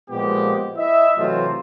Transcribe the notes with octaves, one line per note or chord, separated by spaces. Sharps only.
A#2 F3 G#3 B3 G4
E4 D#5 E5
C3 E3 F#3 A3 C4 F4